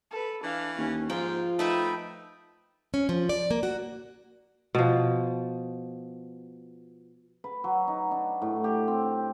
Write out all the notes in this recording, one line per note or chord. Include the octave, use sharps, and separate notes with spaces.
A4 B4
E3 D4 F5
D#2 C#4
G#2 F3 F4 G5
A3 D#4 B4 E5 G5
C#4
F3
D5
A#3
F#4
B2 F3
B4
F#3
D#4
D4
A2
G4
C4